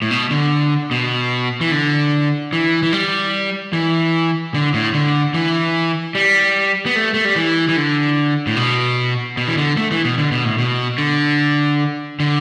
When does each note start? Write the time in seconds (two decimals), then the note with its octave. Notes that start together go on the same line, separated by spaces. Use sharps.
0.02 A2
0.11 B2
0.31 D3
0.91 B2
1.61 E3
1.72 D3
2.53 E3
2.83 E3
2.93 G3
3.73 E3
4.54 D3
4.74 A2
4.94 D3
5.34 E3
6.15 G3
6.86 B3
6.96 A3
7.14 A3
7.25 G3
7.36 E3
7.69 E3
7.76 D3
8.47 A2
8.57 B2
9.37 B2
9.48 E3
9.58 D3
9.77 A3
9.91 E3
10.05 B2
10.18 D3
10.32 B2
10.45 A2
10.58 B2
10.98 D3
12.20 D3